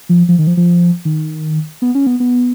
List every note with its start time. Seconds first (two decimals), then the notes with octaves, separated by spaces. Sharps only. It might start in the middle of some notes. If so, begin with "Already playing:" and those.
0.09 F3
0.28 F3
0.39 D#3
0.47 F3
0.57 F3
1.05 D#3
1.82 B3
1.95 C#4
2.07 B3
2.20 B3